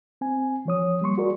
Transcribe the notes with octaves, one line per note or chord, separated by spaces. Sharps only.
C4 G#5
E3 F3 C#5 D#6
G3 A#3 C6 C#6
F#4 G#4 A#4 D5